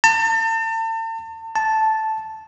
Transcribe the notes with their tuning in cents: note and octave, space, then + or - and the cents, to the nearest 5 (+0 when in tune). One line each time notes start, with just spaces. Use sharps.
A5 +40
A5 -5